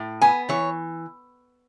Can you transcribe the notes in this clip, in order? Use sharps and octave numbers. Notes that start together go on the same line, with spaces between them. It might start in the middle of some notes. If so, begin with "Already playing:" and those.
Already playing: A2
B3 G#5
E3 C#5